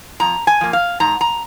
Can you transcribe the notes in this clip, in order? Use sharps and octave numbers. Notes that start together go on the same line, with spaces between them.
F2 A#5
G#5
F3 A#3
F5
G#2 A#5
A#5